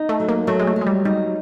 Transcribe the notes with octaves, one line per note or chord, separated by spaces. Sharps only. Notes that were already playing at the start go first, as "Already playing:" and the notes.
Already playing: D#4
A3
F#3
A#3
F#3 A3
G#3
A3
F#3
G#3
G3
G3 D#4